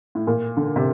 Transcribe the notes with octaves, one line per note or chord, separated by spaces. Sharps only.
A2
A#2
D3
C3